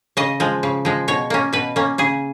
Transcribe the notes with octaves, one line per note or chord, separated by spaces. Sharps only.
C#3 D#5
F3 G#3
C#3
F3 G#3
B2 C#5
A#3 C#4
B2 B4
A#3 C#4
C#3 G#4